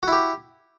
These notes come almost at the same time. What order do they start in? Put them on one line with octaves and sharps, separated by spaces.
F#4 E4 G4